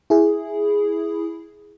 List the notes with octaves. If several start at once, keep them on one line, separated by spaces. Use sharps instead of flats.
E4 G#4